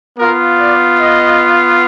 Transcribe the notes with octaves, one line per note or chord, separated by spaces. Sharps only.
B3 F4 A#4
D5
D#5